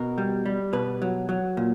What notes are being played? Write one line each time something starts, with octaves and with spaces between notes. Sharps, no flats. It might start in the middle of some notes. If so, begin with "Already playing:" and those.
Already playing: B2 A#4
G3
G3
B2 B4
F#3
F#3
A#2